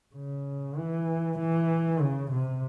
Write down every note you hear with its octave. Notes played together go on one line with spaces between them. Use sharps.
C#3
E3
E3
C#3
C3